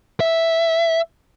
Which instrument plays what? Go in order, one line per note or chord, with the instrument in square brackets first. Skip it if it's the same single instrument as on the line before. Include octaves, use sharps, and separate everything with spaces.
[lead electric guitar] E5